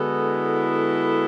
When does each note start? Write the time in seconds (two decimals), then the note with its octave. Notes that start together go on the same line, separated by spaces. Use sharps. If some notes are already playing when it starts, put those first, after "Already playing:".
Already playing: D3 G#3 B3 F#4 A4
0.20 E4